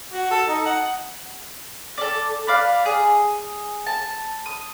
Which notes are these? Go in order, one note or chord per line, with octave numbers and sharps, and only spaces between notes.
F#4
A4
D#4
F#5
A4 D5
B4 D5 F5
G#4
A5
D#6